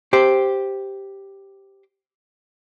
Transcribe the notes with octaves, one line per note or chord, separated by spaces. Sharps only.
G4 C5